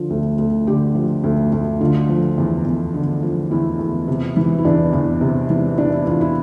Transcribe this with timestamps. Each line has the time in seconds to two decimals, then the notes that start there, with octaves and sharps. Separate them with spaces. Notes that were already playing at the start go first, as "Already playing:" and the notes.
Already playing: D3 F3 F4
0.10 D2
0.38 D2
0.67 D3 G4
0.95 F3
1.24 D2
1.52 D2
1.81 D3 F4
2.09 F3
2.38 E2
2.65 E2
2.94 D3
3.23 F3
3.51 E2 E4
3.79 E2
4.08 C3
4.37 E3
4.58 E4
4.65 E2 D4
4.93 E2
5.21 C3
5.50 E3
5.78 E2 D4
5.93 E4
6.07 E2 F4
6.21 E4